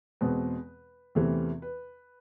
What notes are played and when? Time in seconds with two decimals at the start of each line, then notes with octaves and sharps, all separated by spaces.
0.21 E2 B2 G#3 C4 B4
1.15 E2 C3 E3 A3 C4
1.62 B4